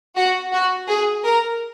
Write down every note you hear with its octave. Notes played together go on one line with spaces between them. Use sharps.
F#4
F#4
G#4
A#4